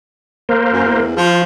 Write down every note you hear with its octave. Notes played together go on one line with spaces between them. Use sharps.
A#3 A#4 C5
F#2
E2
F3 F4